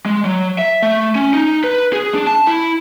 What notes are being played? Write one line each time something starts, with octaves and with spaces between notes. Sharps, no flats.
G#3
F#3
E5
A3
C#4
D#4
B4
G#4
D4
A5
E4